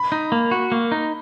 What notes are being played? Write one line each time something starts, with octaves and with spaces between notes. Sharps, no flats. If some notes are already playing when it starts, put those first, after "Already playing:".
Already playing: B5
D#4
A#3
F#4
A#3
D#4